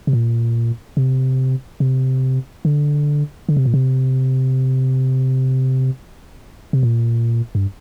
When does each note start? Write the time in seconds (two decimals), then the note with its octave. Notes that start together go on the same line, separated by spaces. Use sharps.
0.07 C3
0.13 A#2
0.97 C3
1.80 C3
2.65 D3
3.49 D3
3.57 C3
3.66 A#2
3.74 C3
6.73 C3
6.83 A#2
7.55 G2